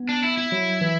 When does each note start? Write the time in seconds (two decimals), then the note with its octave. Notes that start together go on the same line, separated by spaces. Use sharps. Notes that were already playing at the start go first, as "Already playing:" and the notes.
Already playing: B3
0.09 D4
0.23 E4
0.37 E4
0.52 F#3
0.81 E3